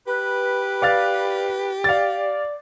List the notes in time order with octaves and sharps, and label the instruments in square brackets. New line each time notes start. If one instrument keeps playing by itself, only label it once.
[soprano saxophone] G4 [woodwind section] B4
[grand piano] D5 F5 A6
[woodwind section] D5 [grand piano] F5 A6